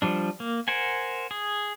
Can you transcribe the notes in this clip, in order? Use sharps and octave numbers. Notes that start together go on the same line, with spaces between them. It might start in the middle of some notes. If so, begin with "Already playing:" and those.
F3 G3 D4
A#3
A#4 C5 F#5 G#5
G#4